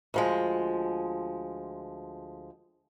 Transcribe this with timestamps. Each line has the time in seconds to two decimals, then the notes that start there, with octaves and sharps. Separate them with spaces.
0.14 D2 F3 G#3